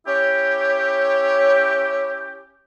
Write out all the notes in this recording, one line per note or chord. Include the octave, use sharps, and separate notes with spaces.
C#4 E4 G4 C#5